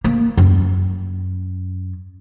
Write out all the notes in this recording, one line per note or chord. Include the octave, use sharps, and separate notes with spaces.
A#3
F#2